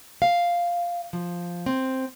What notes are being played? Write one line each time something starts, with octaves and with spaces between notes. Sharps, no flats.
F5
F3
C4